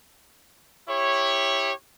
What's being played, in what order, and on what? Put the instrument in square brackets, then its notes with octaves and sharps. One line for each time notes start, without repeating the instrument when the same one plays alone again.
[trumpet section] E4 G4 C#5